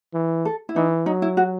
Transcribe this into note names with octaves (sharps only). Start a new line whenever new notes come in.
E3
A4
E4
E3 D#4
F#3 D#4
E4
F#4